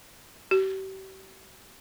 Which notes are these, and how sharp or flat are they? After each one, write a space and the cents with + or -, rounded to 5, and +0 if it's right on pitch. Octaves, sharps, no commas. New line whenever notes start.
G4 -40